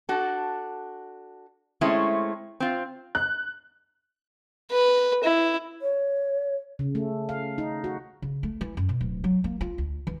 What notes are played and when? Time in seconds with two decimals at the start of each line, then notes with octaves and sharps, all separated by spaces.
0.09 D4 F#4 A4
1.81 G#3 A3 C4 C#4 E4
2.60 C4 F4
3.15 F#6
4.71 B4
5.24 E4
5.82 C#5
6.79 C#3
6.95 A3
7.29 F5
7.58 D#4
7.84 F#4
8.22 C#3
8.43 A3
8.61 E3
8.77 F#2
8.89 B2
9.01 D1
9.24 F#3
9.44 A#3
9.61 F4
9.78 D2
10.07 E3